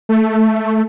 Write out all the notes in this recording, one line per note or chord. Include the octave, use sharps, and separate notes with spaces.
A3